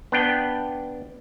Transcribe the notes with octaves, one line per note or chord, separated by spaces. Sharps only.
B3 D4 G5